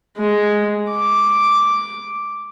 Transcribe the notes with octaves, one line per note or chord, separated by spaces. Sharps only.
G#3
D6